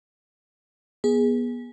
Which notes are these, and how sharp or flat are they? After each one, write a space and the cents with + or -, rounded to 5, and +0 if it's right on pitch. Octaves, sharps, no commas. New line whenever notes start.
B3 -30 G#4 -5